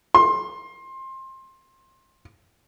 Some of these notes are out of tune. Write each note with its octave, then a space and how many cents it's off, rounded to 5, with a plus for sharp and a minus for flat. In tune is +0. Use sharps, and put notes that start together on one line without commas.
C6 +20